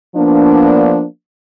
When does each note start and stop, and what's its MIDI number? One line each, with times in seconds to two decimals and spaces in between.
0.16 1.04 53
0.16 1.04 58
0.16 1.04 59
0.16 1.04 62